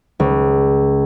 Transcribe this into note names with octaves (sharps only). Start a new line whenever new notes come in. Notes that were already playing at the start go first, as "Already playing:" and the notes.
C#2